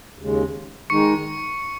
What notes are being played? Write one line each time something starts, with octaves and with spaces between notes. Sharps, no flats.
D#2 C#3 G#3
D#3 G#3 D#4 C#6 C#7